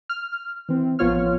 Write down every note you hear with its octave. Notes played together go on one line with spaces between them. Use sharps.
F6
E3 C4
A1 F3 B3 F4 C#5 F6